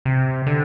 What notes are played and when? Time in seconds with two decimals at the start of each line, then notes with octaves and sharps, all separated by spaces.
0.05 C3
0.46 D3